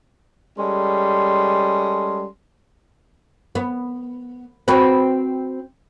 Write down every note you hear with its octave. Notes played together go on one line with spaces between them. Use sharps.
G3 G#3 C#4 A4 C6
B3
C4 F#4 B4